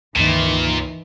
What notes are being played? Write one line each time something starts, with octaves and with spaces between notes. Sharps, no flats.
C#2 G2 A#2 D#3 E3 A#3